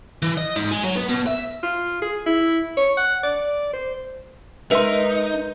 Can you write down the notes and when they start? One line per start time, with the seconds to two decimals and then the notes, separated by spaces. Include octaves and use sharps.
0.22 E3
0.37 D#5
0.56 G#2
0.71 G#3
0.84 F#3
0.95 B3
1.09 B2
1.27 E5
1.63 F4
2.02 G#4
2.26 E4
2.77 C#5
2.98 F#5
3.23 D5
3.73 C5
4.71 G#3 D#4 A#4 B4 E5 C6